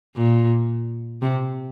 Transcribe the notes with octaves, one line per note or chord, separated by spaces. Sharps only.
A#2
C3